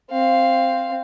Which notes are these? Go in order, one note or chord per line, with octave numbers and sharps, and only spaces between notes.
C4 F5